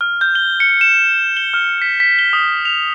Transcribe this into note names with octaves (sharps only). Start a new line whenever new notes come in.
F6
G6
G7
C#7
E7
G7
F6
B6
B6
G7
D#6
F7